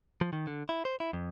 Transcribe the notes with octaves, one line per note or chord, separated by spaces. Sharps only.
F3
D#3
D3
E4
C5
E4
F2